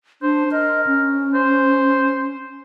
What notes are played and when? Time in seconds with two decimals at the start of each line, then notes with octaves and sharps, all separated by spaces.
0.22 D4 C5
0.52 A#4 D#5
0.87 C#4
1.34 C5